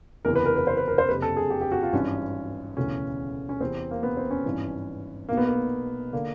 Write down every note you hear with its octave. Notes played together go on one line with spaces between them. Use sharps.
F#1 E2 C3 E3 A#4
B4
A#4
B4
C5
B4
A#4
C5
F#1 F2 C3 B4
A4
G#4
G4
G4
F#4
F4
G#1 G2 E3 C#4
E1 D2 C#3 E3 C#4
C#4
E2 C3 E3 C4
A#3
B3
C4
C#4
G#1 G2 E3
B1 B2 A#3
B3
A#3
D3 A#3